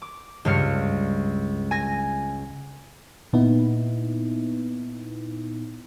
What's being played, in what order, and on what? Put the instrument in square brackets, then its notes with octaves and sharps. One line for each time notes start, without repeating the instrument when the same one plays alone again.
[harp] D6
C#2 G2 F5 C#7
G#5 A#6
[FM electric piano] A#2 B3 D#4 E4